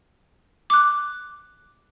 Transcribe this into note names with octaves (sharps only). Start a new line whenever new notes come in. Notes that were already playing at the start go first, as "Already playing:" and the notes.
D6 F#6